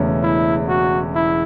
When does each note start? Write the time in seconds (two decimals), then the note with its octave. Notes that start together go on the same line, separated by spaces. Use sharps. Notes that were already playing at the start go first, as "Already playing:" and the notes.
Already playing: E1 E2 C#3 A3 C#4
0.23 E4
0.69 F#4
1.15 E4